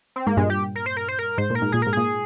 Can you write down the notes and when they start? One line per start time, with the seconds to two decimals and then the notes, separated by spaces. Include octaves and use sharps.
0.16 C4
0.26 G#2 A#3
0.37 G2 A#2 G#3
0.50 G4
0.76 A#4
0.86 C5
0.97 A#4
1.08 C5
1.19 A#4
1.38 G#2 C5
1.50 A#2 A#4
1.62 G#2
1.72 A#2 G#4
1.82 G#2 A#4
1.93 A#2 G#4